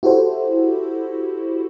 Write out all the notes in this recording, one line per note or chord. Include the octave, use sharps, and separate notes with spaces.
E4 F#4 G4 A4 C5